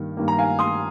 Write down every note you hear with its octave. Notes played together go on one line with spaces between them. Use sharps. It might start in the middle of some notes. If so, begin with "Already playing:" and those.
Already playing: G2 D#3 A#3
G2 D#3 A#3
A#5
F5 G#5
C6 D#6